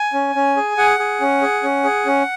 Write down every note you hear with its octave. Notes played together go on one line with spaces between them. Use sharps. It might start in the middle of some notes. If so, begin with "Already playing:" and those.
Already playing: G#5
C#4
C#4
G#4
G#4 F#5
G#4
C#4
G#4
C#4
G#4
C#4